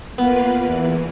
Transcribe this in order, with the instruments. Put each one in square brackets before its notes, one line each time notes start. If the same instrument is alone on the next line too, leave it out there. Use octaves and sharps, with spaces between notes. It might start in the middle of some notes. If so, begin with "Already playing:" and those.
[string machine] A#3 F4 B4 [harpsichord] B3
[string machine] E2 E3